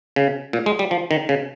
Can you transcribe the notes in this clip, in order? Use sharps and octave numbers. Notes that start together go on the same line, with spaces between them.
C#3
A#2
G#3
G3
F3
D#3
C#3